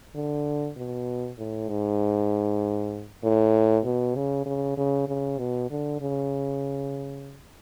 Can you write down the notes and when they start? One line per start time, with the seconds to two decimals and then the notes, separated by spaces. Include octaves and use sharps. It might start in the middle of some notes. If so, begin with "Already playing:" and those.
0.15 D3
0.76 B2
1.38 A2
1.69 G#2
3.23 A2
3.85 B2
4.16 C#3
4.46 C#3
4.77 C#3
5.08 C#3
5.38 B2
5.70 D3
6.00 C#3